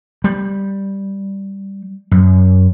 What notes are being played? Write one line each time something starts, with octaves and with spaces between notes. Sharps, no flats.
G3
F#2